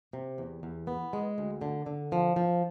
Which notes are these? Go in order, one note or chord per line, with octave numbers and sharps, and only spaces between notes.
C3
E2
E2
B3
G#3
D2
D3
D3
F3
F3